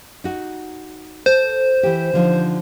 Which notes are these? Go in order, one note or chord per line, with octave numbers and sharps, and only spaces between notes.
D#4 F#4
A4 C5
E3 G4
D3 F3 D#4